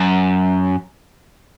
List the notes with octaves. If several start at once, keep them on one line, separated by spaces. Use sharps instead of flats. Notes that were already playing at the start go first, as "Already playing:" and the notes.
Already playing: F#2